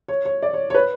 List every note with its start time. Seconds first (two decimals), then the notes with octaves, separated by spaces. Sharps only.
0.08 C#5
0.25 C#5
0.42 D5
0.53 C#5
0.70 C#5
0.74 B4